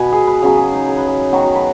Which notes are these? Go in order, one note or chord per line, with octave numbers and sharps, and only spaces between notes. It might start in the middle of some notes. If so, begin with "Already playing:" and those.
Already playing: B2 B3 B4 G#5 B5
G#4
B4
C#3 F#3 B3 G#4
G#4
D#4
G#4
B4
G#4
D#3 F#3 B3 F#4
F#4
B4